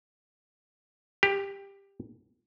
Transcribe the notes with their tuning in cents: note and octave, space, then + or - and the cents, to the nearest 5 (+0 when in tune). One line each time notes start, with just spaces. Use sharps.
G4 +15